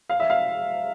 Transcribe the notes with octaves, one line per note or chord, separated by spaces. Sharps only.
F5
E5
F5